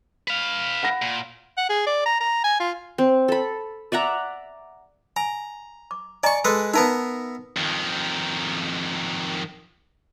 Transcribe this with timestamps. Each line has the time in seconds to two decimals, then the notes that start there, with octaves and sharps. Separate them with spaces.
0.28 B4 F5
0.83 F#5 B5 A#6
1.02 A#2
1.57 F#5
1.69 G#4
1.86 D5
2.06 A#5
2.20 A#5
2.44 G#5
2.60 F4
2.98 C4
3.28 A4 B5
3.92 D5 E5 F#5 A#5
5.16 G#5 A#5
5.91 D6
6.23 D5 D#5 G#5 A#5 C#6
6.45 G#3 A4 B4
6.74 B3 D#4 A#4 E5 A5
7.57 F2 D#3